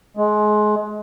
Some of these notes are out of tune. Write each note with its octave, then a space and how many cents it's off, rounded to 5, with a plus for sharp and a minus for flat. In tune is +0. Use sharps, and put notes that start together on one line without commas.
G#3 +25